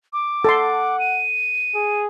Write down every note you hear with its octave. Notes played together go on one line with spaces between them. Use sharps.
D6
A4 F#5 A5 C6
D#7
G#4